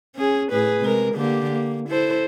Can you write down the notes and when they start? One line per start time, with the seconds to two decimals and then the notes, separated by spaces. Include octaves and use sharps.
0.15 C#4 G#4
0.51 A2 G#4 B4
0.81 C3 G#3 A#4
1.14 D3 A#3 G4
1.50 A#3
1.89 E4 A4 C5